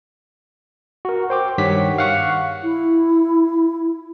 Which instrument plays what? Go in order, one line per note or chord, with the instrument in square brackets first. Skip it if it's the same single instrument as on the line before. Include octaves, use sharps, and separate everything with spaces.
[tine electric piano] F#4 A#4
C5 G5 D6
G2 D#3 G4 C#5 F#5 B6
F5 F#5 C#6
[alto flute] E4